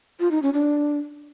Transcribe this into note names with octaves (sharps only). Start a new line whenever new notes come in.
F4
D#4
C#4
D4